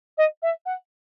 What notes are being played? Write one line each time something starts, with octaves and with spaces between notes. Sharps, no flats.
D#5
E5
F#5